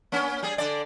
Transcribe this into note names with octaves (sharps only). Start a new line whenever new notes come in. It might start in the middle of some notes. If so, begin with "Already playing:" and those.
A#3 C#4
G3 G#4
D3 D5